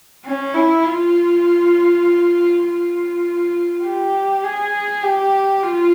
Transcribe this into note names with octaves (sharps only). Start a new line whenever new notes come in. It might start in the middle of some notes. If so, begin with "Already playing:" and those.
C#4
E4
F4
F4
G4
G#4
G4
F4